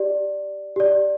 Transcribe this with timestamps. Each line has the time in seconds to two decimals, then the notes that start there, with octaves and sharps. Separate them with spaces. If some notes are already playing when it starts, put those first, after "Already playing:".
Already playing: G4 D5
0.76 G4 D5